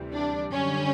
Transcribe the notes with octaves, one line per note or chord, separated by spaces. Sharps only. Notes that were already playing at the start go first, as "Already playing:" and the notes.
Already playing: D2 C3 E3 G3
D4
F#2 D3 G3 C#4